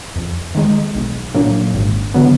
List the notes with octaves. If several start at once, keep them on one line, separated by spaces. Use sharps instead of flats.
F2
D#3 G#3 D#4
B1
A#2 F#3 A#3 D4
G#1
D3 F#3 B3